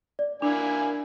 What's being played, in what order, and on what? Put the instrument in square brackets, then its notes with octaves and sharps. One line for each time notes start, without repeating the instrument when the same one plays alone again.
[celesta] D5
[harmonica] A#3 E4 G#5 [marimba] D4